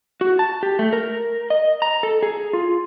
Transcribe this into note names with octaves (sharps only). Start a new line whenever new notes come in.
F#4
A5
G4
A3
A#4
D#5
A#5
A4
G#4
F4